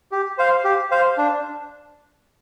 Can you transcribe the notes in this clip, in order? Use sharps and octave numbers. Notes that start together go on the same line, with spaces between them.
G4
C5 F5
G4
C5 F5
D4